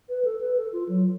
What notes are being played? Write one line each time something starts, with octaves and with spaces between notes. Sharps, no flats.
B4
A4
B4
A4
F4
F#3